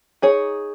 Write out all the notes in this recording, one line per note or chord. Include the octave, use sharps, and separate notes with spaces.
D#4 G#4 C#5